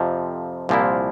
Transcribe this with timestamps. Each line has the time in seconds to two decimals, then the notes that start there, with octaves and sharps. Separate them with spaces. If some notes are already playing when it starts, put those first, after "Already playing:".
Already playing: F2 C3 F3
0.69 C2 A#2 F3 A#3 E4